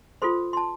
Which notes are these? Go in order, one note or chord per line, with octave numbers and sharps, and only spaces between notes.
F4 A4 C5 C6
C6
A5